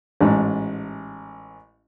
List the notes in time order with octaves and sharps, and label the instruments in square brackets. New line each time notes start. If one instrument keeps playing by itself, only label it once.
[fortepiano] A1 G#2